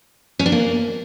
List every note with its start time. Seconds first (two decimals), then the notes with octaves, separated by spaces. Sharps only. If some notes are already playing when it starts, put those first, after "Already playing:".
0.39 C#4
0.46 D4
0.52 A#3